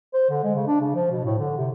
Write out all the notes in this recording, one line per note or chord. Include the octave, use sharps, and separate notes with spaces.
C5
D3
G#3
C#3
D4
C#3
F3
B2
A2
D3
C3